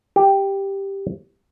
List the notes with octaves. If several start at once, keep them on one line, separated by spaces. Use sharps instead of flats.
G4